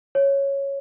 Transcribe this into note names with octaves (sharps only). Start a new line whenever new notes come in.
C#5